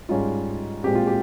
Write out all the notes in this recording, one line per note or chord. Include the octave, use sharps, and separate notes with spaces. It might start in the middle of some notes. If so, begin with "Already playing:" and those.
G#2 G3 C#4 F4
A#2 G#3 C4 G4
F4
G4